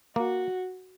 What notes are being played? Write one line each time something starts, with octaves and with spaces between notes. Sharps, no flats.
A#3 F#4